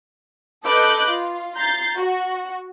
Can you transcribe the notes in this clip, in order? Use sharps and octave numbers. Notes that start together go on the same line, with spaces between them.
A4 B4 D#5 D6 F#6 G6
F4
A#5 G6 A6 C7
F#4